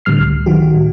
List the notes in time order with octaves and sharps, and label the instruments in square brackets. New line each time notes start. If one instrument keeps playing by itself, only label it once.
[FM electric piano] A2 D3 G3 F6 C7
C#2
D#3 F#3 F#4 G4
F#4
A2